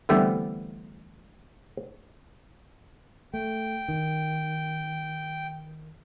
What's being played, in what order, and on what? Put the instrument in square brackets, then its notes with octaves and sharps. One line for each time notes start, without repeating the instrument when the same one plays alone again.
[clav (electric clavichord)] D3 E3 G3 A3 B3 C4
[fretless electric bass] A3 [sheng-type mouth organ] G5
[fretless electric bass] D#3